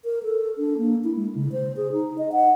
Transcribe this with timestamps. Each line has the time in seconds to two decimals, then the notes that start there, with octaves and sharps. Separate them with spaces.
0.05 A#4
0.23 A4
0.58 D4
0.78 A#3
1.04 E4
1.16 G#3
1.35 C#3
1.52 C5
1.76 G#4
1.92 D#4
2.18 D#5
2.32 F#5